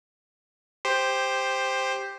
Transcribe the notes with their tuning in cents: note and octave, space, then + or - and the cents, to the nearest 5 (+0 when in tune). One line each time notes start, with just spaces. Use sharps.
G4 +10 C5 +0